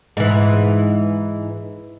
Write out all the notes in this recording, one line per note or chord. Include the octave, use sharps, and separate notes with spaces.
G#2 E3